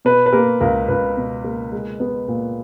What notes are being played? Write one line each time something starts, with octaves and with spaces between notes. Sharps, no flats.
B2 B4
B4
A#3 A#4
C#2 A#4
C#2 B4
B2
A#3
G#3
B3
A#2